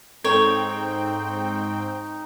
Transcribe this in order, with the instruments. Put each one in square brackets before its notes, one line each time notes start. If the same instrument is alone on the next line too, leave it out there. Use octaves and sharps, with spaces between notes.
[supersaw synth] G#2 C4 G5 [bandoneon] D#4 [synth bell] A4 [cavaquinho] C#5